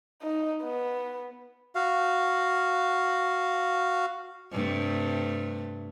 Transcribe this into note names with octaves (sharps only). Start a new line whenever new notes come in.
D#4
B3
F#4 F5
G2 C3 A3